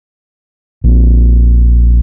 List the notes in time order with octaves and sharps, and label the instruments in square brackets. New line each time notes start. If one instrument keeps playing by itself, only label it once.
[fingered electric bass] A#1 C4